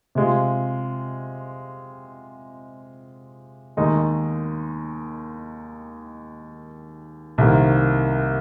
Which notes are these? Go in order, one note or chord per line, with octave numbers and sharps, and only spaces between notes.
C3 G#3 F4
D#2 D#3 G#3 D#4
C2 C3 D#3 A#3